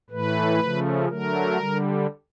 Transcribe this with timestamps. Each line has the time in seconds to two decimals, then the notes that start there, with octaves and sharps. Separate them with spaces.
0.10 A2 E3 A3 B4
0.60 C#3 F3 A3
1.08 D3 F#3 A3 A#4
1.58 D3 G3